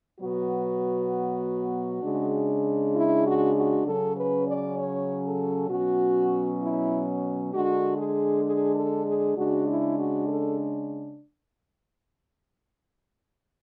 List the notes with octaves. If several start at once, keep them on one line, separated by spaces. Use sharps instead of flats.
B2 F#3 B3 F#4
C#3 G#3 D4
E4
F#4
F#4
C#3 F#3 C#4 A4
B4
D5
C#5
A4
B2 F#3 C#4 F#4
E4
D3 G#3 D4 F#4
G#4
G#4
A4
G#4
C#3 G#3 D4 F#4
E4
F#4
A4